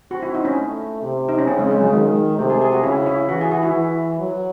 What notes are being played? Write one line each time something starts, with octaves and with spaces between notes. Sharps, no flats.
C4 F#4
E4
D#4
C#4
A3
C3
D#4
C#4
C#3 C4
G#3
G#3
F#3
D#3 G#3
C3 A3
G#4
G#4
F#4
C#3 E4
E4
E3 F#4
G#4
F#4
E4
E3
F#3